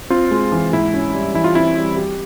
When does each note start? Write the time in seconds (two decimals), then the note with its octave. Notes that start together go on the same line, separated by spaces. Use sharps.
0.10 C4 F4
0.31 G#3
0.52 E3
0.73 G#2 E4
0.94 C#4
1.14 G3
1.34 E3 E4
1.44 F4
1.55 C4 E4
1.76 G3
1.97 G4